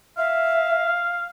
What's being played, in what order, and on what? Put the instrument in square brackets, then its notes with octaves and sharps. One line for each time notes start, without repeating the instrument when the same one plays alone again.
[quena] E5 [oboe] F5